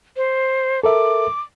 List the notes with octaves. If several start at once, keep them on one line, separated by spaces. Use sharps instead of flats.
C5
A4 A#4 E5 D6